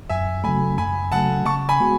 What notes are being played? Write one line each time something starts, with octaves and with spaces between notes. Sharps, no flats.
F#2 E5 G#5
C#3 F#3 A3 G#5 B5
F#2 G#5 B5
C#3 F#3 A3 F#5 A5
C#3 A5 C#6
G#5 B5
G#3 B3 F#4